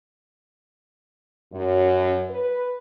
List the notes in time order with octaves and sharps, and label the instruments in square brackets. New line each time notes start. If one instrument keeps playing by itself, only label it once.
[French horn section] F#2
B4